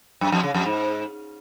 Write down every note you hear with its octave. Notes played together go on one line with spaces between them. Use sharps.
F#2
F2
C#3
F2
G#2